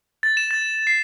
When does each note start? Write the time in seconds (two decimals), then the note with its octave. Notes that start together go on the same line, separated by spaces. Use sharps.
0.23 A6
0.37 E7
0.51 A6
0.87 C7